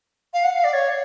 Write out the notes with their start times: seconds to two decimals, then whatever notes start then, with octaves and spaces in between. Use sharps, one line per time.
0.34 F5
0.44 F#5
0.54 F5
0.64 D5
0.73 C#5